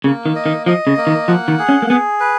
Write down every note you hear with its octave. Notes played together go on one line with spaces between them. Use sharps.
C#3 A#3
D#3
D#5
D#3
F3 D#5
C#3
A#3
D#3
F3 F#5
D#3
G#4
C#4
A#3
B3 G#4
B4